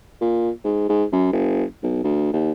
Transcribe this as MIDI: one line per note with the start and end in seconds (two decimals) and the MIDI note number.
0.21 0.50 46
0.64 0.84 44
0.89 1.04 44
1.12 1.29 42
1.32 1.64 30
1.83 2.01 35
2.04 2.29 38
2.33 2.52 39